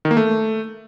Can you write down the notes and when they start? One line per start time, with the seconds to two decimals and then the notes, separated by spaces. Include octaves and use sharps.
0.05 D#3
0.11 A#3
0.17 A3